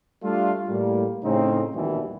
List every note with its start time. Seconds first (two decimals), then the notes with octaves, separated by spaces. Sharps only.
0.22 G3 A3 D4 F4
0.68 A2 G3 A#3
1.23 A2 C#3 C4 D#4
1.75 A#1 D#2 B2 E3 G3